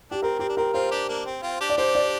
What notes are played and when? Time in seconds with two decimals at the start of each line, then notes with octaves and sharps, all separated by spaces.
0.11 D4 G4
0.22 C4 A#4
0.39 C4 G4
0.49 D4
0.57 C4 A#4
0.73 C4 F4 C5
0.91 D4 G4
1.08 A#3 D4
1.26 C4
1.43 C4 F4
1.60 D4 G4
1.69 D5
1.77 D4 G4 C5
1.95 D5